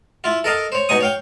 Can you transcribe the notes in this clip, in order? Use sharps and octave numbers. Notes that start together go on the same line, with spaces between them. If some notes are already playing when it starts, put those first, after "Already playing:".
E4 F4
A4 A#4 D#5 F5
C5 C#5
B2 D#4 G#5 C#6 D#6
C#5 F5 G5